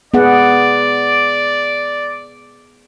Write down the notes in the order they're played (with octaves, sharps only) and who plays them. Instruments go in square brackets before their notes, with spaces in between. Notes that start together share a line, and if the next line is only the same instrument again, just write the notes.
[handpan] B3 G#4 F#5 [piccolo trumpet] D5